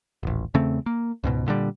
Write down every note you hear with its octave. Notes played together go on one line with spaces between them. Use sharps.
D#1 A1
E2 C#3 A3 C4
A#3
C#2 G#2 B2
A#2 D3 D#3 G3